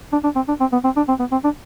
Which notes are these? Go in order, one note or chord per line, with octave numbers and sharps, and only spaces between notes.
D4
D4
C4
D4
C4
B3
C4
D4
C4
B3
C4
D4